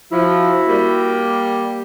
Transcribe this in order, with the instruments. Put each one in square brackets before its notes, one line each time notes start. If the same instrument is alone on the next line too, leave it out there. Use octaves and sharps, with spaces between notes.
[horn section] F3 [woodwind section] E4 F#4
[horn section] G3 A#3